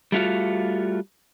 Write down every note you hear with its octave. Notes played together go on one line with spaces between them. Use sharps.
G3 A3 F4 F#4 F5